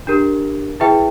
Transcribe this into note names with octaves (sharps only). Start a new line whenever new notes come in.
D4 G4 A#4
E4 G#4 B4 E5 G5